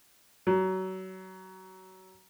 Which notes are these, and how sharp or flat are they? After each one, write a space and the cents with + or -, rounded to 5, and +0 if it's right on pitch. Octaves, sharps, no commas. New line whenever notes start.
F#3 +25